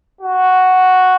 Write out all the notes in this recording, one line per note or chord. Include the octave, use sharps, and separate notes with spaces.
F#4